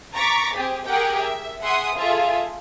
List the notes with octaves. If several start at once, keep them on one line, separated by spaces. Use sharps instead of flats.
A#5 C#6 D6 A6 B6
C4 G4 G#4
G4 G#4 A#4 F#5 G5
E5
G#4 E5 F#5 C6 D#6
F4 G#4 A4 E5